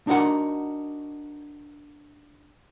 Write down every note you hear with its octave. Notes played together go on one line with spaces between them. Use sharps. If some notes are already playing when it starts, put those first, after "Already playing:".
D4 D#4 F#4 A#4 F#5